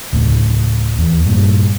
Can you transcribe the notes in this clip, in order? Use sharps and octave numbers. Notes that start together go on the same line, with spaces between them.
D1 A2 C#3
E2
G2 A#2